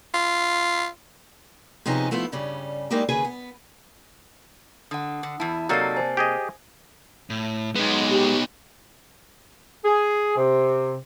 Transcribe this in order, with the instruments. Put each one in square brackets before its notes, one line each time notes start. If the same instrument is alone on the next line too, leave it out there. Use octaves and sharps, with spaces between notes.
[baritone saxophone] F4
[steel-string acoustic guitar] C3 F3 B3 C#4 D#4 G#4
F3 A3 B3 E4 F4
G2 C#3 G3 C#4
G3 G#3 A#3 D#4 E4 G4
D#2 C#3 G#4 B4 G#5
B3
[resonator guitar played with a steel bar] D3 [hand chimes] F#5 D#6
[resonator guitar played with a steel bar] D3
[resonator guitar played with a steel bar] E2 E4 [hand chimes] A5
[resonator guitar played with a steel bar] C3 A#3 [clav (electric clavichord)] F#3 D#4 A4 [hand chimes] D5 A5 A6
[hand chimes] C5 G#5
[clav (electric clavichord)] G4 G#4 D#5
[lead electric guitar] A2
[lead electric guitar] G#3 [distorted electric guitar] B3 D#4
[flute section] G4
[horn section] G#4
C3